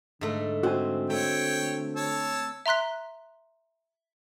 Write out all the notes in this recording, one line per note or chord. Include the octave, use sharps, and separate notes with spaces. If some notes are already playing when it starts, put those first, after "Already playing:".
G#2 D3 A3
C4 F#4 C5 G#5
A3 C#5 G5
C#5 A5 E6
E5 A#5 C6 F#6 B6